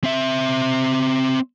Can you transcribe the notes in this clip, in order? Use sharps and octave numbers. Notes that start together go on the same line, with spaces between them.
C4 E5